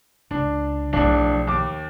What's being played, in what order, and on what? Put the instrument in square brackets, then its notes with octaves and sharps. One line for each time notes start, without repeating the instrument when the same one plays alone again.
[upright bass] C#2 [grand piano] D4
[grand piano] D1 D4 [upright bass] B1 F3
[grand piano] D#2 D6